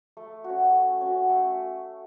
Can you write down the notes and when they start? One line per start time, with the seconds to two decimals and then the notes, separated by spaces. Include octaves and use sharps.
0.17 A3
0.44 F#4
0.49 C#4
0.73 A3
1.01 C#4 F#4
1.30 A3